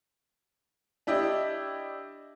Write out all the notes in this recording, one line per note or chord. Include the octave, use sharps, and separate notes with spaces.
D4 E4 G4 D#5